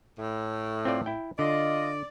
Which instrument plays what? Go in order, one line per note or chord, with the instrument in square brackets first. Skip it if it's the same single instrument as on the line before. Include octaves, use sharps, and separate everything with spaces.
[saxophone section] A2
[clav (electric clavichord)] C4 F4 D5
E4 G5
[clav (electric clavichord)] D3 [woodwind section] F4 D#5 [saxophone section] D5